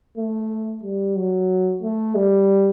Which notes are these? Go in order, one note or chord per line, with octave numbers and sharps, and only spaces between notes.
A3
G3
F#3
A3
G3